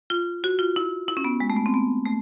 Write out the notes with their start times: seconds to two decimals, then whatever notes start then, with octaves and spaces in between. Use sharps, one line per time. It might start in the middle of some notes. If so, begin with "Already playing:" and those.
0.10 F4
0.44 F#4
0.59 F4
0.76 E4
1.08 E4
1.17 C#4
1.24 B3
1.40 G#3
1.50 A3
1.57 B3
1.66 C4
1.74 B3
2.05 A3